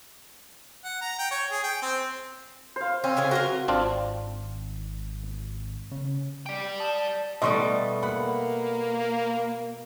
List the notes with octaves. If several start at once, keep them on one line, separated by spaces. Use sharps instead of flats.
F#5
A#5
G5
C#5
G#4
G5
C4
C5 F5
C4 C#4
C#3 E3 G#4
F#3 F4 F#4 A#4
G#1 C4 D4 F4
C#3
D5 G5
A5 E7
B2 G3 A3 D#5 C6 C#6
A#3 F#5 B5